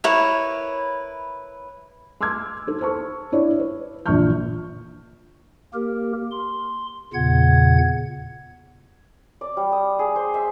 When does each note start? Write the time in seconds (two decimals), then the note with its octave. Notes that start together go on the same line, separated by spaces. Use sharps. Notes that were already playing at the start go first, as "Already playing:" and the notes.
0.04 E4 A#4 B4 C#5
2.21 C6 D6 E6 F6 G#6
2.67 D#4 A4
2.81 C5 A5 C#6
3.32 D4 E4 C#5 D5
3.60 B4
4.06 A#1 D3 E3 C#6 F6 G6
5.74 A#3 G4 A#4
6.32 C6
7.14 E2 A#2 C#3 F#5 G#6
9.41 D5
9.57 G3
9.72 D#6
9.99 G#4
10.16 C5
10.34 E5